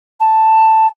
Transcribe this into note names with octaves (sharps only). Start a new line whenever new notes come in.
A5